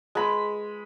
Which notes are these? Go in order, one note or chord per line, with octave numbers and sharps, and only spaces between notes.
G#3 B5